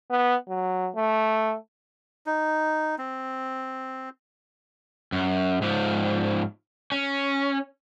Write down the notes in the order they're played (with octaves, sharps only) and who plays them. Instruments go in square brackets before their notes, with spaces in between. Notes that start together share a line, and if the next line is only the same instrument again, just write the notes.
[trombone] B3
F#3
A3
[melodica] D#4
C4
[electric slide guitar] F#2
G#2 F3
C#4